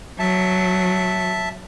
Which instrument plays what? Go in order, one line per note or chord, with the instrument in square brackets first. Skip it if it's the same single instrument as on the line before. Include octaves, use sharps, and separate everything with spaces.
[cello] F#3 [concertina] E5 A5